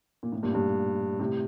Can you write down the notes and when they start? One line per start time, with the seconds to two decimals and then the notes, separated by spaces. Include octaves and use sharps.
0.23 A#2
0.32 A2
0.43 G2 A#2
0.54 G2 A#2
1.19 A2 C3